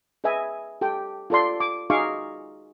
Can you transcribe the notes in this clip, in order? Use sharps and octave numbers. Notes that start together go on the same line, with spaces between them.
G#4 B4 D#5 E5 G#5
G4 A4 G5
F4 A4 D5 C6
D6
D#4 F#4 G#4 F5 C#6 D6